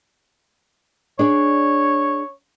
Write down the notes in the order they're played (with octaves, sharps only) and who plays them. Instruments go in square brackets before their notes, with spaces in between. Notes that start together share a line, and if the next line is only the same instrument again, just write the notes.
[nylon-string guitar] D4 G#4 D5 [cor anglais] C#5